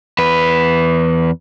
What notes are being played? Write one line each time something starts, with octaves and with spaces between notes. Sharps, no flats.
E2 B4